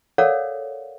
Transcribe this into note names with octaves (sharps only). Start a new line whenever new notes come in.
A4 A#4 C#5 D5 F5 F#5